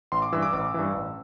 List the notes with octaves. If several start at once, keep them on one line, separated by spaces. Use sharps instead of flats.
A1 C6
D6
G2 E3 E6
D6
A1 D6
G2 E3
A1